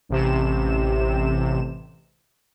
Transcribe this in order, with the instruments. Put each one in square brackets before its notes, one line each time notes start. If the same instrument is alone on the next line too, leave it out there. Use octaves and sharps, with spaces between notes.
[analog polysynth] A1 C3 E7